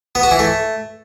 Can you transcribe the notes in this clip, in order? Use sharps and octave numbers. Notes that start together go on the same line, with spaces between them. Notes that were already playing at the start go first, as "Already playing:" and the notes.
B3
F#4
E3
A3